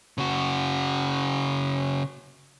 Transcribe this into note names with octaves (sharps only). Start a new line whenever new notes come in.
C#3 F#4